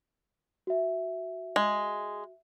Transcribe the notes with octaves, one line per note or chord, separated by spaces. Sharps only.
F#4 E5
G#3